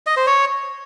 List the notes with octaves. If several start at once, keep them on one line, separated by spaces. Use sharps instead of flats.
D#5
C5
C#5